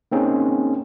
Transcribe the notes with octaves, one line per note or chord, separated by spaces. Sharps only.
A#3 C4 C#4 D#4 G#4